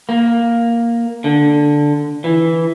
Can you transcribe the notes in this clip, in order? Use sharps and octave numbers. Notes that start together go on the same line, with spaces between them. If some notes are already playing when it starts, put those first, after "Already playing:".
A#3
D3
E3